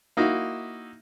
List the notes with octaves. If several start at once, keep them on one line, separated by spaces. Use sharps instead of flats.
A#3 D#4 E4 F#4 E5